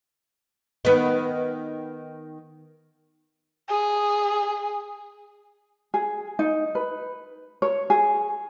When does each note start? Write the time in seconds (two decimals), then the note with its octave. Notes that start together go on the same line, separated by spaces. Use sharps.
0.85 D#3 B3
3.69 G#4
5.94 G#4
6.39 D#4
6.75 B4
7.62 C#5
7.90 G#4